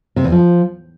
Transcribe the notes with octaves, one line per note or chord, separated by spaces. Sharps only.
C3
E2
F3